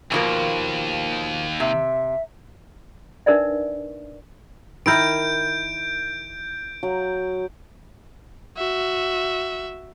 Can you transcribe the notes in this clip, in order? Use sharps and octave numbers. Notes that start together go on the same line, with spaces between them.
D#2 B2 F3 A#3
C3 E5
D4 D#4 A#4 B4 D5 E5
D#3 E4 A#4 G6 D7
F#3
F#4 E5